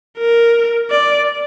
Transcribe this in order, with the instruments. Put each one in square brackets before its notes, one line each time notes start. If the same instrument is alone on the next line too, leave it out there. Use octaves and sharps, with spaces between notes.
[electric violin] A#4
D5